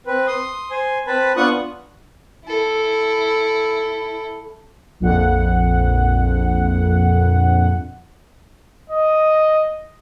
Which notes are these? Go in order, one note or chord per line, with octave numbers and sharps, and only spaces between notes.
C4 B4
C6 D#6
C5 G#5
C4 B4 A5 B5
B3 D4 F4 C#6 D#6 F#6
E4 A4
A#1 F2 F#5
D#5